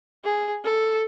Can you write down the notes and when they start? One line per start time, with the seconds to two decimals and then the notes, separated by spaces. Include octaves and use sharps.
0.24 G#4
0.64 A4